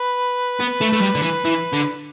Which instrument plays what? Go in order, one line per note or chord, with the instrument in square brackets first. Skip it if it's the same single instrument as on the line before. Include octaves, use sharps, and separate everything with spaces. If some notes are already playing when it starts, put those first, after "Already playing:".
Already playing: [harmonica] B4
[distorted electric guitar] B3
A3
A3
G3
D3
E3
E3
D3